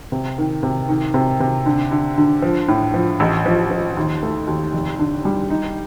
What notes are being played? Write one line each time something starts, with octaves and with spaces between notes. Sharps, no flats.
C3
D#3
C3
D#3
C3
C3
D3
D3
D3
F3
A2
F3
A1
F3
F3
D#2
A3
D#2
F1
D3
G3
D#4